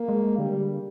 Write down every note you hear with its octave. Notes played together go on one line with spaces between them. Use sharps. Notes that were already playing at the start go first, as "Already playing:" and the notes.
Already playing: A#3
G#3
D3 G3